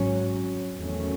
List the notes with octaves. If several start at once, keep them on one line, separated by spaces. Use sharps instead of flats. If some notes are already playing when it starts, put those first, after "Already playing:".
Already playing: G#1 G#2 F#3 C#4
E2 D#3 F#3 A3 C#4